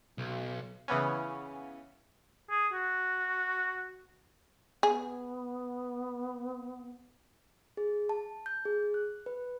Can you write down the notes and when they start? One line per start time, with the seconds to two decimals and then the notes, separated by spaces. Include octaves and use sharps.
0.18 B1
0.88 C#3 E3 B3 C#4
2.50 G#4
2.73 F#4
4.83 B3 G#4
7.77 G#4
8.09 A5
8.46 G6
8.65 G#4
8.94 F#6
9.26 B4